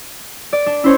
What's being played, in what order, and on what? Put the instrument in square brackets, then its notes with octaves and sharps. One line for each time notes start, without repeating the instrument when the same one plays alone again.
[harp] D5
D4
[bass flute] C#4 [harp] E4 C5 C#5